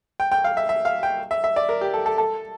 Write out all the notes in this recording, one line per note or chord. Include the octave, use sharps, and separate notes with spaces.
G5
G5
F5
E5
E5
F5
G5
E5
E5
D5
A#4
G4
A4
A4
A4